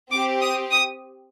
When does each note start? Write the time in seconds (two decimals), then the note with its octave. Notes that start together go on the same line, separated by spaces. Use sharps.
0.11 C4 G4 D6
0.41 D#6
0.71 D#6